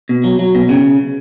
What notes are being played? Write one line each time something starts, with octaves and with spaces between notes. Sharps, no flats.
B2
F#3
F#3
B2
C#3